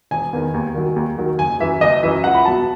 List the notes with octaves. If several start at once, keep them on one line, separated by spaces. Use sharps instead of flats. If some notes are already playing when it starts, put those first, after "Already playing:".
E1 G#5
E2 D#3
D#2
D#3 F#3
D#2
D#3 F#3
F#1 G#5
F#2 E3 E5
F#1 D#5
F#2 E3 E5
C#2 F#5
B5
B2 F#3 A5